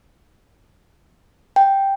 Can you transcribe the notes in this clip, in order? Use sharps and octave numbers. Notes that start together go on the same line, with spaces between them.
G5